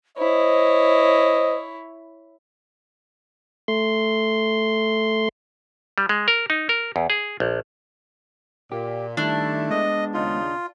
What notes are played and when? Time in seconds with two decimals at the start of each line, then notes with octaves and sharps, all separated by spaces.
0.17 E4 C5 C#5 D#5
3.68 A3 C6
5.98 G3
6.09 G#3
6.28 A#4
6.50 D#4
6.69 A#4
6.96 E2
7.10 G#4
7.40 A#1
8.72 A#2 G4
9.17 D#3 G3 A3 D4 E4
9.70 G#3 B3 D#5
10.14 D#2 C#3 D#4 F4